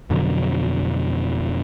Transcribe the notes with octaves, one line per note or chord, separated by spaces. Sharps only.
F2 B2 D3 F#3